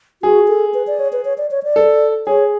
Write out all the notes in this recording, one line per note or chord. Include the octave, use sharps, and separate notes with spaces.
F#4 G#4
A4
B4
D5
C#5
B4
C#5
D5
C#5
D5
A4
G#4 C#5